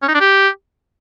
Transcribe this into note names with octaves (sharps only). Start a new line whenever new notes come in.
C#4
D#4
D4
G4